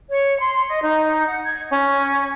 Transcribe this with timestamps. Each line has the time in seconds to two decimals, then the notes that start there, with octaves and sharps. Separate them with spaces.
0.09 C#5
0.42 C6
0.68 D#5
0.83 D#4
1.26 F#5
1.45 G#6
1.70 C#4